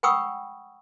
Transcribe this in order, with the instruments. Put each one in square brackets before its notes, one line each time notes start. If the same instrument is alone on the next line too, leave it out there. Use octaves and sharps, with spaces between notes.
[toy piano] F#5 G5 B5 C#6 D#6 E6